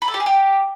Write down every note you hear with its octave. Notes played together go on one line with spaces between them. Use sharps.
B4
A4
G4
G#4
G4